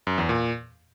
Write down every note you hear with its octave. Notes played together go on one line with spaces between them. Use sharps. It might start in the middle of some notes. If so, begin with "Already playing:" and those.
F#2
E2
A#2